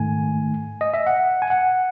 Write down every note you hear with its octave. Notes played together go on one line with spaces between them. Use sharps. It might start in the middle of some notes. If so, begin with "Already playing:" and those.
Already playing: G#2 D#3 A3 G#5
D#5
E5
F#5
G#5
F#5